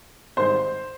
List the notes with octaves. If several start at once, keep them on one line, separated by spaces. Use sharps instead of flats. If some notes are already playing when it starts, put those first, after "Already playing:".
G#1 G#2 G3 C5 C6